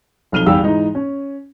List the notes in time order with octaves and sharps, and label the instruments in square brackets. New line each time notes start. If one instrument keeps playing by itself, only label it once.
[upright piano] B1 F2 F6 D#7 F7 G7
G#1 E2 G3 G4 F5 E6
G#2 E3 D#4
C#4